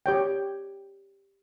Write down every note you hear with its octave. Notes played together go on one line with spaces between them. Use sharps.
G4 C#5 G5